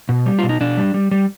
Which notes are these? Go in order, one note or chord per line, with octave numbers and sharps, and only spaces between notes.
B2
G3
B2 F4
D#4
B2 D4
G3
G3
G3